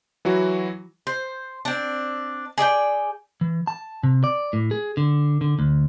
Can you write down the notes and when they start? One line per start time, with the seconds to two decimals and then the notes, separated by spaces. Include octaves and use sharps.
0.25 E3 F#3 E4 F#4
1.07 C5
1.65 C4 D4
2.58 G#4 D5 E5 G5
3.41 E3
3.67 A5
4.03 C3
4.24 D5
4.53 A2
4.71 G#4
4.97 D3
5.41 D3
5.59 D2